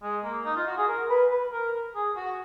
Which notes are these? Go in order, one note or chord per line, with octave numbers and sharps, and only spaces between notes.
G#3
A#3
D#4
F4
F#4
G#4
A#4
B4
B4
A#4
G#4
F#4